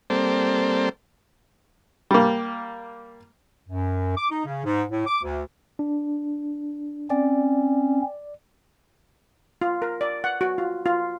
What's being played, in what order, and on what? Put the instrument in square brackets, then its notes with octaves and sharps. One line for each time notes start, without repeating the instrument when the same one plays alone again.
[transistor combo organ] G3 A#3 C4 A4 C5 D5
[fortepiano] G3 A#3
[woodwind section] F#2
D6
D#4
C#3
G#2
A2
D6
D2
[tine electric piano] D4
[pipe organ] C4 C#4 [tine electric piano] D5
[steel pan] F4
A#4
D5
F#5
F#4
F4
F4